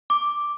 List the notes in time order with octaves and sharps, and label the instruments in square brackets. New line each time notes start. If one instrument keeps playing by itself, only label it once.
[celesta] D6